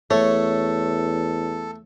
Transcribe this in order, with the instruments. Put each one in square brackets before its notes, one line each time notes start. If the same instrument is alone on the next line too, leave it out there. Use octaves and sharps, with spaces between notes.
[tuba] E2 [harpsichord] A3 [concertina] A4 [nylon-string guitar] C#5